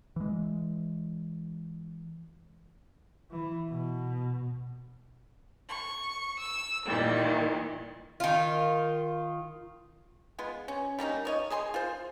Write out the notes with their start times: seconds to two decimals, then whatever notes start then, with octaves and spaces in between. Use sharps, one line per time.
0.16 E3 G#3
3.31 E3
3.71 B2
5.67 C#6
6.38 E6
6.85 A#2 D#3 E3 G3
8.20 D#3 F4
10.38 G#3 B3 F4 C6
10.68 C#4
10.99 G3 A#3 C#4 D#4
11.25 F3 C#5 D#5
11.50 G#4 D#5 G#5 C6
11.74 F4 C5